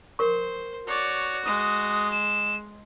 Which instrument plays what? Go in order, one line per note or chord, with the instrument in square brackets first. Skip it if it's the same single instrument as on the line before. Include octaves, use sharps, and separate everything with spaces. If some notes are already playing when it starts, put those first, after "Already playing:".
[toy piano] A#4 C#6 [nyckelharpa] C5
[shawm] F#4 [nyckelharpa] C#5 D5
[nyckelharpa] G#3 [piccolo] D#6
[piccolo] E7